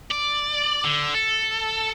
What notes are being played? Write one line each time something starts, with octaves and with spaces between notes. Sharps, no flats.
D5
D3
A4